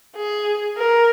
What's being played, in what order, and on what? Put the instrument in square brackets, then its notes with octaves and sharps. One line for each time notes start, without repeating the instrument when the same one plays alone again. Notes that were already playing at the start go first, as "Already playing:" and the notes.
[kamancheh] G#4
A#4